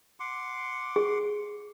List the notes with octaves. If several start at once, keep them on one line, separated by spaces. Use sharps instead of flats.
F#5 C6 D6
G#4